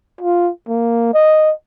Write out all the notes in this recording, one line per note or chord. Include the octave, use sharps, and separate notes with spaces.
F4
A#3
D#5